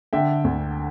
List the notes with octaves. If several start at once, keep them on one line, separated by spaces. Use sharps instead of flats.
D3 E5 G5
D2